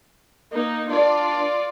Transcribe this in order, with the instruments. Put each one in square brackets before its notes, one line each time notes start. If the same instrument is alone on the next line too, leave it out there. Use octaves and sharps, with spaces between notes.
[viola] A#3 D#4
[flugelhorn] D4 [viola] F4 D5